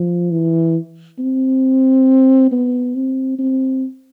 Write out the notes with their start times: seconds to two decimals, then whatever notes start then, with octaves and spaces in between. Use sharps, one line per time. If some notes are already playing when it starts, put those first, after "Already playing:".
Already playing: F3
0.31 E3
1.19 C4
2.51 B3
2.95 C4
3.39 C4